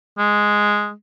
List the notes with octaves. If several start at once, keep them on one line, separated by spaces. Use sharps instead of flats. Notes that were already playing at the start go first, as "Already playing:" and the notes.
G#3